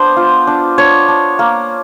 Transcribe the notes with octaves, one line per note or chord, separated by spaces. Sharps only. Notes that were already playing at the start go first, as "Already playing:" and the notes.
Already playing: B3 D4 C5
F4
D4
D4 C#5
D4
A#3